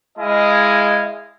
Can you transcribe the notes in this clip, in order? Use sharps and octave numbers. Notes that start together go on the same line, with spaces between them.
G#3 E4 D#5 F5 G#5